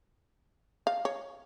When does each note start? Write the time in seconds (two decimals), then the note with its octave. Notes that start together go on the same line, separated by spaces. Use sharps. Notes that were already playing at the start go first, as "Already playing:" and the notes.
0.87 F5
1.05 C#5